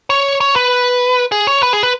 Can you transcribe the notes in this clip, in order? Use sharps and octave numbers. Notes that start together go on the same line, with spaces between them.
C#5
C#5
B4
G#4
C#5
B4
G#4
B4